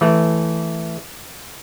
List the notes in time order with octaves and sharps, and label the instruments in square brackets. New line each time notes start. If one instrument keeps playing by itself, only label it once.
[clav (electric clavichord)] E3 A3